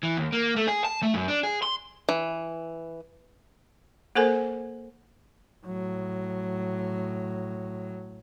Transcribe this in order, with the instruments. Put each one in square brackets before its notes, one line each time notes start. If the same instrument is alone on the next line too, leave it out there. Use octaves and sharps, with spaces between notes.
[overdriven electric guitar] E3
D#2
A#3
A3
G#4
A5
A3
F#2
D4
G#4
C6
[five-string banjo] E3
[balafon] A#3 A4 A#4 C5 G#5
[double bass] A2 F#3